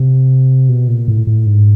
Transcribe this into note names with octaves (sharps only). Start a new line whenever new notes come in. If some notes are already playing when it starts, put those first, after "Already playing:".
Already playing: C3
B2
A#2
A2
A2
G#2